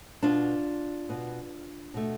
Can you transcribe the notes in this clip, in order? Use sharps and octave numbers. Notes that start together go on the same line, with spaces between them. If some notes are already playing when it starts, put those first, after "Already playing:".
B2 B3 D4 F4
B2 B3
B2 A3